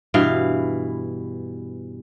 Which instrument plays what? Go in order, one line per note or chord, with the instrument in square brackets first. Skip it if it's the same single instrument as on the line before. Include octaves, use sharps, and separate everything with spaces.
[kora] G2 B2 E3 F5